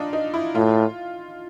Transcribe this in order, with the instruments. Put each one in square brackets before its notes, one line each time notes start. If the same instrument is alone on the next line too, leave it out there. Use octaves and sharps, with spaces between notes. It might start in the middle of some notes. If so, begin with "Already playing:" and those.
Already playing: [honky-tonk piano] D4 D#4 F4
D#4
E4
[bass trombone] A2 [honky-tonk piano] F4